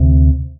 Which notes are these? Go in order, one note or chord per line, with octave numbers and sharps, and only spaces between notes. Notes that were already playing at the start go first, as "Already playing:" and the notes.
Already playing: D2 C3